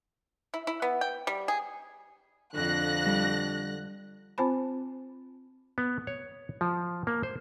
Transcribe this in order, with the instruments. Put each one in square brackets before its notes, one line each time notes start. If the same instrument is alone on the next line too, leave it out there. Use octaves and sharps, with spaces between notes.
[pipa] E4
E4
B3
G5
G3
G#4
[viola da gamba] F2 F4 [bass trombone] D3 [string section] F#6 A#6
[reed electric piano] G3
[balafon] C4 F4 C5 A5 B5
[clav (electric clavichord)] B3
C#5
F3
A#3
C5